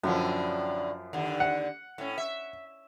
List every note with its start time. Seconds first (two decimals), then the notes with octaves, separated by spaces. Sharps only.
0.04 F#2 A2 D3 F3 C#4
1.13 D#2 D3
1.40 F#5
1.98 A2 C#4
2.18 E5